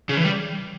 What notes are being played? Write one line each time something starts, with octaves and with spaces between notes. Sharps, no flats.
C#3
E3
G3